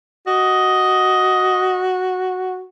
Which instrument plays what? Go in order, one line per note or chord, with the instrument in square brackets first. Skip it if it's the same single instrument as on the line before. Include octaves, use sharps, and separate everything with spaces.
[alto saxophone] F#4 [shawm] D#5